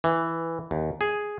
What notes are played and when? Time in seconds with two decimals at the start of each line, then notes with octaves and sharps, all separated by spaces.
0.04 E3
0.71 D#2
1.01 G#4